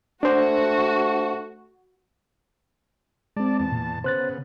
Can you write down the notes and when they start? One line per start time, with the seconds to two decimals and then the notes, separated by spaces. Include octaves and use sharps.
0.23 A3 D4 F#4 C5
3.37 G#3 C4 D5 A5
3.59 E2 A5
3.72 A#2
4.04 C#3 B3 C5 F#6 A6